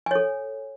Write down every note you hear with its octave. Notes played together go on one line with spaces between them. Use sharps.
A4 C#5 G#5